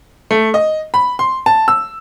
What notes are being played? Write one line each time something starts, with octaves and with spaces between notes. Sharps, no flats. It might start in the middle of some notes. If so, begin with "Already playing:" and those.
A3
D#5
B5
C6
A5
E6